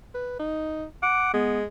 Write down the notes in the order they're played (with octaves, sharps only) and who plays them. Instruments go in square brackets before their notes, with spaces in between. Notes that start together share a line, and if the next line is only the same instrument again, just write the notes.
[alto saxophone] B4
D#4
[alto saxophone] F#5 [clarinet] D6
[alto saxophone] G#3 [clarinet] B3